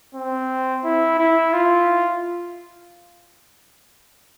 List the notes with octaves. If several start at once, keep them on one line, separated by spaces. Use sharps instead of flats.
C4
E4
E4
F4